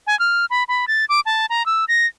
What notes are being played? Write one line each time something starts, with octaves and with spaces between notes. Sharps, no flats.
G#5
F6
B5
B5
A6
D6
A5
A#5
E6
A#6